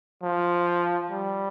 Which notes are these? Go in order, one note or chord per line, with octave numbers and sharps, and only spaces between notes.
F3
G3